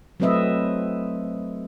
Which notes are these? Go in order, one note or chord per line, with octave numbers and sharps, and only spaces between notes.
F#3 A3 C4 B4 D#5 E5